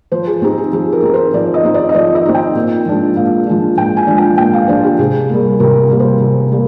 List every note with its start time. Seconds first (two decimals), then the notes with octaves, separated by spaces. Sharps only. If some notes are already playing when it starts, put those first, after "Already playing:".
0.12 F3 C5
0.27 G#4
0.42 C4 D#4 G4
0.58 G#4
0.73 F3 G#4
0.92 A#4
1.03 C4 D#4
1.14 C5
1.34 F3 D5
1.54 D#5
1.64 C4 D#4
1.74 D5
1.89 D#5
1.95 F3 D5
2.15 D#5
2.25 C4 D#4
2.34 G5
2.55 A#2
2.86 F3 G#3 D4
3.16 A#2 F5
3.47 F3 G#3 D4
3.77 A#2 G5
3.97 G#5
4.07 F3 G#3 D4
4.18 G5
4.38 A#2 G5
4.53 F5
4.68 F3 G#3 D4 C5
4.84 G4
4.99 C3 G#4
5.29 G3 A#3
5.60 C3 A#4
5.90 G3 A#3
6.00 C5
6.20 C3
6.51 G3 A#3